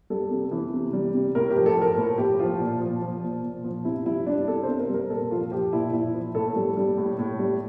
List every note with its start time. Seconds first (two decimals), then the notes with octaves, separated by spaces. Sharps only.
0.10 G3 A4
0.31 C3
0.51 E3
0.73 C3
0.93 G3
1.14 C3
1.35 A2 A#4
1.51 G4
1.56 F3
1.66 A4
1.77 F3 A#4
1.97 A2
2.18 A2 G4
2.39 F3 F4
2.60 A#2
2.81 F3
3.02 F3
3.23 A#2
3.43 A#2
3.64 F3
3.85 C3 E4
4.06 G3 E4
4.26 G3 D4
4.48 C3 A4
4.63 C3 C5
4.79 A#4
4.89 G3 A#4
5.10 A#2 A4
5.31 F3 F4
5.51 F3 G4
5.73 A#2 E4
5.93 A#2 E4
6.14 F3
6.35 A2 A4
6.56 G3
6.77 G3
6.98 A2
7.19 A2
7.39 G3